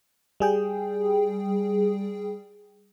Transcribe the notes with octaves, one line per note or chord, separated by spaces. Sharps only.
G3 G#4 G5